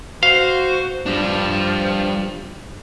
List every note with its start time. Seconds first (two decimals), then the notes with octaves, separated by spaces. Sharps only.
0.23 F#4 C5 F5
1.06 F3 G3 D4